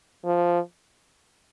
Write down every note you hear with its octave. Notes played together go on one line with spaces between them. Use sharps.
F3